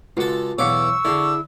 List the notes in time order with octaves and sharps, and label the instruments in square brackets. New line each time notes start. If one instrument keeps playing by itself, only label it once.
[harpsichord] C#2 A4 [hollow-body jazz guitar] F4 F#4
[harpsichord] B1 E2 D6 [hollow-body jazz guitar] C#5 F5 F#5 [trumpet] C#6 [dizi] E6
[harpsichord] D3 [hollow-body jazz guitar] E4 G#4